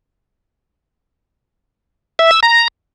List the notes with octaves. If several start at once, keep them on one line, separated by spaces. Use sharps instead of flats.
E5
E6
A#5